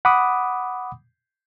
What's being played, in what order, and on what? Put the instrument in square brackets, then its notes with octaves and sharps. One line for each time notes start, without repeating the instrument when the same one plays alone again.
[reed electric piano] F#5 B5 D6 D#6